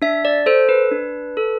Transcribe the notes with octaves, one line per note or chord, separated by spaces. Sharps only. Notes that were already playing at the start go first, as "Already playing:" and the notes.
D4 E5
D5
A4 C5
B4
D4
A4